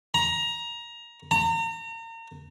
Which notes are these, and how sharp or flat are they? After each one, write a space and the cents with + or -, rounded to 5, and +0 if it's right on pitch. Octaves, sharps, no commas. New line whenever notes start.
A#5 +20
A#5 -35